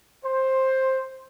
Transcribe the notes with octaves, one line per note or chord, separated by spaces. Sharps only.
C5